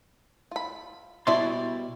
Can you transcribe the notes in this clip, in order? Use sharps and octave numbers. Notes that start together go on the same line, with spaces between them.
F4 B5
B2 G3 E4 D5 A5 C6